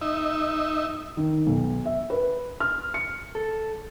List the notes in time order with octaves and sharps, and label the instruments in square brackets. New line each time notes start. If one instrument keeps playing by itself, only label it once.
[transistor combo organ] D#4 E5
[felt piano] D#3
B1
E5
B4
F6
C#7
[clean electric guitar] A4